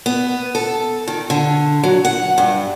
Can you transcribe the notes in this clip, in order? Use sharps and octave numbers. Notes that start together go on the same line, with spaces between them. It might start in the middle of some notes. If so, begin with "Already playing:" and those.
B3
A4
D#3
D3
F#3
F#5
G2